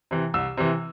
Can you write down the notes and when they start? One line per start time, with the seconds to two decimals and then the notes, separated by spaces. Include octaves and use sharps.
0.11 C3 E3
0.34 C2 E6
0.57 C3 E3